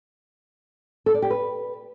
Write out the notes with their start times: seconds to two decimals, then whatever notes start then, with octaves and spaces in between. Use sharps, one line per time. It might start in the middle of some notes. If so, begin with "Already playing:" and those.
1.06 A4
1.14 D5
1.22 G4
1.30 B4